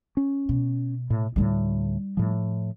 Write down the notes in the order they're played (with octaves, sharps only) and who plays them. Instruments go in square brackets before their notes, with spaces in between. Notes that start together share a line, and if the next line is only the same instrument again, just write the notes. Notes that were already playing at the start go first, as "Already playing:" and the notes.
[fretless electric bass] C#4
[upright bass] B2
[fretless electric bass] A2
[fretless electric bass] D2 A2 [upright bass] G3 D#4
[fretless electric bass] A2 F3